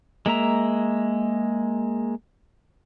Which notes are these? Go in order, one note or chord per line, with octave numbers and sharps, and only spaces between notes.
G#3 A#3 E5 A#5